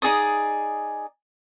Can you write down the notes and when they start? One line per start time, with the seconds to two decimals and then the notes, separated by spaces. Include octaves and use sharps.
0.02 D#4 G#4 D5 D#6